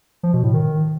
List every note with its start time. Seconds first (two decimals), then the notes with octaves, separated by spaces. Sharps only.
0.23 F3
0.33 B2
0.44 A2
0.54 D#3